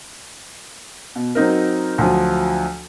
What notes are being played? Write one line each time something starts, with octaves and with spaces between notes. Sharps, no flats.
B2
F#3 C4 D#4 A#4
D2 F3 F#3